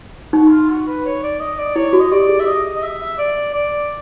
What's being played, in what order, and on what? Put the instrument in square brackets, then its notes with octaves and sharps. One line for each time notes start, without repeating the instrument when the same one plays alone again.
[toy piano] D#4 [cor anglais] F#4
[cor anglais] E4
F4
F#4
B4
C#5
D5
D#5
D5
[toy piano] E4 [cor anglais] C#5
[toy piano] F#4
[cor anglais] D#5
[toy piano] G4 [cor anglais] D5
[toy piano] G#4
[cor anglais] E5
[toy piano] G#4 [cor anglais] D#5
[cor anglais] D#5
E5
E5
D5
D5